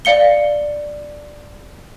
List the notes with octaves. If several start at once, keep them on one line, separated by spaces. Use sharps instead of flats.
D5 F5 C#7 G7